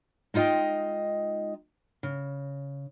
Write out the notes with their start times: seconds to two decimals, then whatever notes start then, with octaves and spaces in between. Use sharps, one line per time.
0.34 G#3 D#4 F4 D#5 G5
2.03 C#3